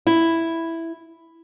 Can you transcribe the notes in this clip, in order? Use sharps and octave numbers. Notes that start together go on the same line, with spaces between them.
E4